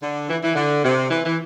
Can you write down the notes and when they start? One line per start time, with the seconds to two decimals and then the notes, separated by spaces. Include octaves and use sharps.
0.02 D3
0.30 E3
0.44 E3
0.56 D3
0.83 C3
1.10 E3
1.26 E3